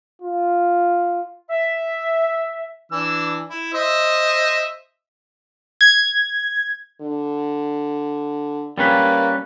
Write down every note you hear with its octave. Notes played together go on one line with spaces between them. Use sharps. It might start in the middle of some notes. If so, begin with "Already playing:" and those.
F4
E5
E3 D4 E6
E4
C5 D#5 E5
G#6
D3
G3 A#3 C#4 B4